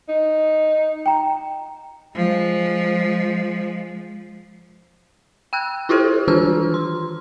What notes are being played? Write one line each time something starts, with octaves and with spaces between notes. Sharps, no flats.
D#4
G5 A#5
F3 G#3
G5 E6 F#6
E4 F4 G4 A4 C5
D#3 E3 D4 F4 E6 F6
C6